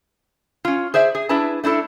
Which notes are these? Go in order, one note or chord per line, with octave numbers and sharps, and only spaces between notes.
C#4 F4
G#4 C5 D5 E5
G#4
D4 E4 G#4 B4 A5
A3 D4 E4 A4